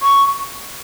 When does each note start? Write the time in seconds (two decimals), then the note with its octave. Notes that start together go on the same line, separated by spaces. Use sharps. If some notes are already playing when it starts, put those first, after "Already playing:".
0.03 C#6